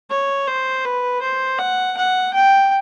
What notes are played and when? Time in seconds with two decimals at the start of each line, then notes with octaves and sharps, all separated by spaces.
0.11 C#5
0.47 C5
0.85 B4
1.22 C5
1.59 F#5
1.97 F#5
2.34 G5